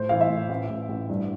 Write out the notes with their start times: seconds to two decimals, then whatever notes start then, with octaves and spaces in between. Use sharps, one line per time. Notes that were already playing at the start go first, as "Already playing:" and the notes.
Already playing: A2 C5
0.09 E3 F5
0.21 E5
0.30 A2
0.49 A1
0.70 A1
0.89 A1
1.09 G2